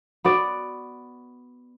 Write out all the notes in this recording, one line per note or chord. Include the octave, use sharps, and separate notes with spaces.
B3 F#4 D5